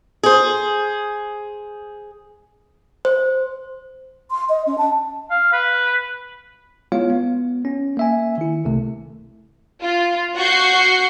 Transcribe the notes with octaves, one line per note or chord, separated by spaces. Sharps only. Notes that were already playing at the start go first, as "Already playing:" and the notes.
G#4 C5
C5
C6
D#5
C#4
A5
F5
B4
G#3 B3 E4 F4 C#5 F5
B3
C#4
A#3 E5 G#5
D#3 E4
C2 C3 A3
F4
F#4 F#5 C#6 G6 C7